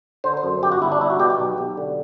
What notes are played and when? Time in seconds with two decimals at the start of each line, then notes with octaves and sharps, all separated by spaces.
0.24 D3 C5
0.37 C5
0.43 F#2
0.63 G1 G4
0.72 F#4
0.82 G1 E4
0.92 D4
1.01 G3 E4
1.10 F#4
1.20 B2 G4
1.30 G4
1.39 B1
1.58 B1
1.77 D3